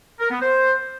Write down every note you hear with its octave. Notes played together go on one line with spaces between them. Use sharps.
A#4
B3
C5